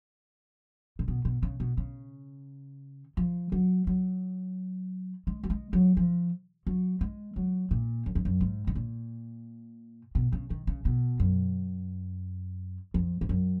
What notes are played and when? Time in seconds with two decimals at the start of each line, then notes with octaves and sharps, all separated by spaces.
0.99 A#2
1.08 B2
1.25 B2
1.43 C#3
1.60 B2
1.77 C#3
3.17 F3
3.52 F#3
3.87 F#3
5.27 G#3
5.43 F#3
5.50 G#3
5.73 F#3
5.97 F3
6.67 F#3
7.01 G#3
7.36 F#3
7.71 A#2
8.06 F#2
8.15 F2
8.25 F#2
8.41 G#2
8.67 G#2
8.75 A#2
10.15 B2
10.32 C#3
10.50 D#3
10.67 C#3
10.85 B2
11.20 F#2
12.94 F2
13.21 G#2
13.29 F#2